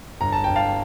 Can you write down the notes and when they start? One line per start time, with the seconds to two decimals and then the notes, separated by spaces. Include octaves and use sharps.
0.21 G1 A#5
0.32 A5
0.44 G1 G5
0.56 F5 A5